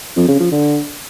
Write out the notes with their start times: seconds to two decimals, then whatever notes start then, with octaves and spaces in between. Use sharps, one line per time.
0.16 F2
0.28 C#3
0.40 F3
0.52 D3